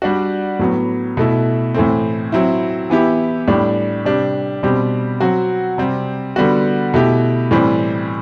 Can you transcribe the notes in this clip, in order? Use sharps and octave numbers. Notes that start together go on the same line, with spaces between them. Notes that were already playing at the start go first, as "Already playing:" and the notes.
G3 D4 F#4
A2 F#3 B3
B2 A3 E4
A2 E3 A3 C4
F#3 C4 E4
E3 B3 E4 G4
A2 G3 D4 G4
C3 G3 D4 G4
B2 G3 C4 G4
F#3 C4 F#4
C3 G3 C4
D3 G3 B3 F#4
B2 A3 E4 G4
A2 E3 G3 C4